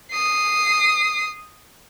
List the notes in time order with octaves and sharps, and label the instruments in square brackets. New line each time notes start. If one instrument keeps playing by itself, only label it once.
[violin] D#6 C7